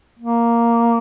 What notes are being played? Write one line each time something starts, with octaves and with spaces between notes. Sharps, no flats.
A#3